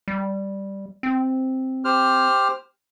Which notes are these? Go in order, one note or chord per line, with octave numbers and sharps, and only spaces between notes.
G3
C4
G4 C5 F6